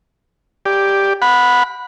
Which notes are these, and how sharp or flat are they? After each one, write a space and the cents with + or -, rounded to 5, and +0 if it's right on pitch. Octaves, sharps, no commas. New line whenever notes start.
G4 +10 D5 +0
F#5 -25 B5 +0